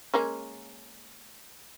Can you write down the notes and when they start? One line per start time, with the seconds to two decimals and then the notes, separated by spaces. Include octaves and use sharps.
0.14 G#3 A#3 C#4